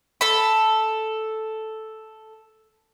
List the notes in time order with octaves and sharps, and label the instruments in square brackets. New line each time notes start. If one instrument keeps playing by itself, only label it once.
[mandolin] A4 B5